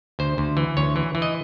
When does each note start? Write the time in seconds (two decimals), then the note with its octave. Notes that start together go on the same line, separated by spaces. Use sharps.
0.19 D2 C5
0.38 D2
0.57 E3
0.77 D2 C#5
0.96 E3
1.15 E3
1.22 D#5